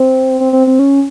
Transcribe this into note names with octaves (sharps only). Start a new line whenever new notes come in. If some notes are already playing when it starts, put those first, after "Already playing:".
Already playing: C4
C4
C4
C4
C#4